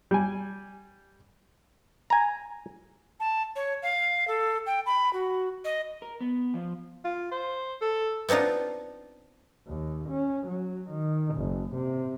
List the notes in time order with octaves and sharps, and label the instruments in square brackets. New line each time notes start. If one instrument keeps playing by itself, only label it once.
[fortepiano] G3 G#5
[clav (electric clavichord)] G#5 A#5
[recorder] A5
C#5
F5
A4
G5
B5
F#4
D#5
[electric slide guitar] A#4
B3
F3
[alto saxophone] F4
C5
A4
[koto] B3 C4 D4 D#4 F4
[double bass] D#2
C#4
F#3
D#3
F#1
C3